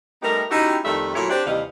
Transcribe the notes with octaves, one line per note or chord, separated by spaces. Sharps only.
G3 A3 B3 D#4 G4 A#4
C#4 D#4 E4 F#4 G4
F2 D#3 G3 A3 E5
A#2 F#3 A3 E4 C#5
C4 D4 G4
D#2 C3 E3 G3 D#5 F5